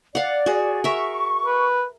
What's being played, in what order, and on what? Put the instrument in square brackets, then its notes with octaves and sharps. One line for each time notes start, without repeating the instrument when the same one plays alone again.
[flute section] D5 [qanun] F5 F#5
[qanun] F#4 G#4
[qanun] A#4 E5 [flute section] C#6
[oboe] B4